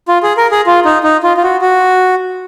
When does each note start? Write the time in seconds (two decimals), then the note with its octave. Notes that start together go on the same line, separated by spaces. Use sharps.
0.08 F4
0.23 G#4
0.37 A#4
0.51 G#4
0.66 F4
0.85 D#4
1.04 D#4
1.23 F4
1.37 F4
1.43 F#4
1.61 F#4